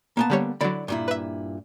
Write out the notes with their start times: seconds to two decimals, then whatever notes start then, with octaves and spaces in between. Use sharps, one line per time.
0.17 A#3 B3 A5
0.30 D3 G3 C#5
0.61 D3 F#3 E4 D5 B5
0.88 G2 A#2 E4
1.08 B4 E5